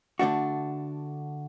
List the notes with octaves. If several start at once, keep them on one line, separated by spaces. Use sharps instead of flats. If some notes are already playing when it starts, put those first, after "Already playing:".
D3 A3 D4 F#4